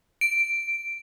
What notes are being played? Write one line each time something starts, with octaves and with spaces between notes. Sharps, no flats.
D7